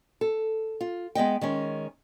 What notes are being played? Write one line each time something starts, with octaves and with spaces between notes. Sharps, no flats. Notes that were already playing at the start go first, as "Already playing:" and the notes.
A4
F4
G#3 B3 D#5 G5
D#3 G#3 C#4